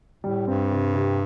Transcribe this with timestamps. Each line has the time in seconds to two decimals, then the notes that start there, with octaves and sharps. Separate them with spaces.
0.24 A2 G3
0.47 G2 C4
0.71 C3
0.94 C3